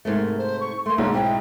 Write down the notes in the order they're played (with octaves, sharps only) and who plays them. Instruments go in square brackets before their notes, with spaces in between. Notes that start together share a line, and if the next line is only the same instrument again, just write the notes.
[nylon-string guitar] G#2 C3 A3 [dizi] A#4
[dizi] C5
C#6
[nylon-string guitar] A3 A#3 [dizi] C6
[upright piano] B1 G#2 [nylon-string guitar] D3 D#4 [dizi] C#5
[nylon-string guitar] C4 E4 G#4 [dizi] G5